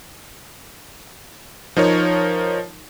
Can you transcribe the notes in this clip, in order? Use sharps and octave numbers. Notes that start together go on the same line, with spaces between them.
F3 D#4 A#4 C#5